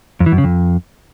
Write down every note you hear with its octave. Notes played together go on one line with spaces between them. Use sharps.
F2
E3
F#2
C#3
F2